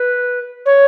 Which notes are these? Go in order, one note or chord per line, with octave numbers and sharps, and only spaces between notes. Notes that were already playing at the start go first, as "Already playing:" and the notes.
Already playing: B4
C#5